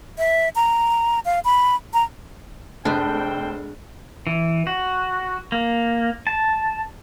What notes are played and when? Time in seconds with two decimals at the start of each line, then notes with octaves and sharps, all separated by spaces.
0.18 E5
0.55 A#5
1.25 F5
1.45 B5
1.93 A#5
2.85 F1 G#3 B3 D4 A4 B4 C5 G5
4.27 E3
4.67 F#4
5.52 A#3
6.27 A5